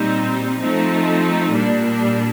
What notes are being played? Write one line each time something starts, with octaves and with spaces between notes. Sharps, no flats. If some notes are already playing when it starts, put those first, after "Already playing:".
Already playing: A#2 G3 C4 D#4
F3 A3 C4 D#4
A#2 G3 A#3 D4